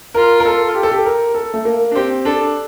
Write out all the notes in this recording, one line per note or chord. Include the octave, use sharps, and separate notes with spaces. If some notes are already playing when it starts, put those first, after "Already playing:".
F4 A#4
A#4
A4
G4
A4
G4
A#4
A4
A3
A#3
D4
C4 G4
D4 A4